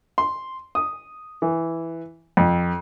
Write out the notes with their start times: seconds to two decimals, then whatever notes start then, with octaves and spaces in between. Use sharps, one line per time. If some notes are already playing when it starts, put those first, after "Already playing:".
0.18 C6
0.75 D#6
1.42 E3
2.37 F2